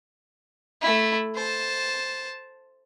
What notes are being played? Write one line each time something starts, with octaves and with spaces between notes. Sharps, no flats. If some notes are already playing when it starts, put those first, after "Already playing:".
A3 E4
C5 A5